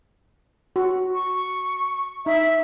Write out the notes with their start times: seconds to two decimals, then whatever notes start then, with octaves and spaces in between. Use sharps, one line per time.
0.76 F#4
1.14 C#6
2.26 D#4 E5